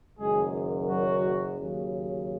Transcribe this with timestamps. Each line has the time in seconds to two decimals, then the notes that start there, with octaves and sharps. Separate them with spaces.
0.19 F#1 F#2 D#3 G#3 G#4
0.88 F#3 F#4
1.59 D#2 C#3 F#3